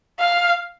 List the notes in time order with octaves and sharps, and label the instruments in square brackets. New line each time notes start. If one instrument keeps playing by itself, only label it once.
[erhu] F5